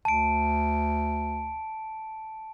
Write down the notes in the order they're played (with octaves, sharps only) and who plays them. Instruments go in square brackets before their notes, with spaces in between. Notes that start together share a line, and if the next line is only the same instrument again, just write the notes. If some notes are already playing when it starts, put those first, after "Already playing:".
[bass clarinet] D2 [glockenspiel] A5 D7